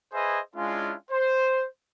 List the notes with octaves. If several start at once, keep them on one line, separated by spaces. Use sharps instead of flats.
G#4 B4 C5 D#5 E5 G#5
G#3 C#4 D4 E4 F4
C5